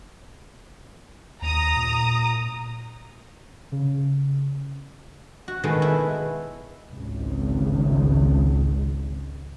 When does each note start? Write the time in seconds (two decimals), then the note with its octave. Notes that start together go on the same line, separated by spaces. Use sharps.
1.42 D#2 A#5 D#6
1.77 A#2
3.72 C#3
5.48 F#4
5.63 B2 D#3 G#3 A3 B3
5.82 E4
6.93 G#1 C#2